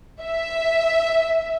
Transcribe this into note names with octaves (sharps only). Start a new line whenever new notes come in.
E5